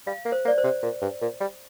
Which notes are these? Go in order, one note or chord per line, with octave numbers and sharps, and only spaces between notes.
G3 F5
A#3
C5
A#3
D5
C5
C3
A#2
G2
A#2
G3